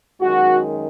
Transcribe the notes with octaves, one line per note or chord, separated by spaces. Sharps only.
F#2 D#3 G#3 F#4